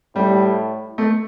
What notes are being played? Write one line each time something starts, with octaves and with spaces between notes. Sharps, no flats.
A2 G3
A3